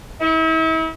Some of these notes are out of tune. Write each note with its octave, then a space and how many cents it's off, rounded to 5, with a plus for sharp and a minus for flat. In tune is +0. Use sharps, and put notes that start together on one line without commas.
E4 -40